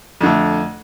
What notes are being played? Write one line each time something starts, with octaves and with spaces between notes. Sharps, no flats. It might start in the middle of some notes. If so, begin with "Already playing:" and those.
F2 D3 A3